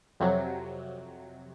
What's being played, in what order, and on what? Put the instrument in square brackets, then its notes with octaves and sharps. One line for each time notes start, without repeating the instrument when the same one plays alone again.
[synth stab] F2 C3 F#3